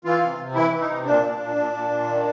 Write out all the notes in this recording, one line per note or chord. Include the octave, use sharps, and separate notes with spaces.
E3 F4
C3
C3
E3 E4
E3
D#4
C3
A#2 D4
A#2
A#2
A#2
A#2
A#2
D#3